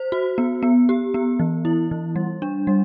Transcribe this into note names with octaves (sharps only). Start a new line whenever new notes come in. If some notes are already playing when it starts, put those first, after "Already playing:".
Already playing: C5
F#4
B3
B3
G4
B3
E3
E4
E3
G3
D4
G3